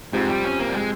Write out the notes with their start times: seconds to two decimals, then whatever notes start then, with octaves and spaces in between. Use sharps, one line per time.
0.13 F2 G#2 C3 F3 C4 G4
0.29 G3
0.44 C#4
0.60 A#3
0.69 G3
0.75 G#3